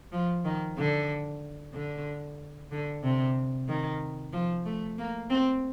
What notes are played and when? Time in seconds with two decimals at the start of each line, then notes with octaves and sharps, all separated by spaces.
0.12 F3
0.45 D#3
0.78 D3
1.74 D3
2.72 D3
3.03 C3
3.68 D#3
4.33 F3
4.66 A3
4.99 A#3
5.30 C4